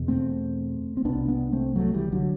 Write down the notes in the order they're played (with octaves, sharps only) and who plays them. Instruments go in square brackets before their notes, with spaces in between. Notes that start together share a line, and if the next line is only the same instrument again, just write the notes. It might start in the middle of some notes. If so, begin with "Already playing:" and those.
Already playing: [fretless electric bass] E2 B2
A3 C4
C4
C2 B2 B3 D4
B3 D4
A3 C4
F#3 A3
E3 G3
D3 F#3